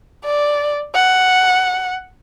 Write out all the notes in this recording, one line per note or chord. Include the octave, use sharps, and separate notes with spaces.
D5
F#5